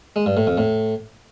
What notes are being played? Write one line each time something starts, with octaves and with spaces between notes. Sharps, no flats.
G#3
G2
A2
F2
A2